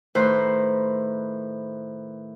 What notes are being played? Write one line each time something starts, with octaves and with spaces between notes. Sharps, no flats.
A2 D#3 B4 C5